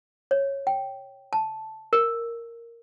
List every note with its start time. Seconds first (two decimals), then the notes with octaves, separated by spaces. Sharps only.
0.31 C#5
0.67 G5
1.33 A5
1.93 A#4